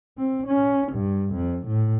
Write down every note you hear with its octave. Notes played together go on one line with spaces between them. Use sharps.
C4
C#4
G2
F2
A2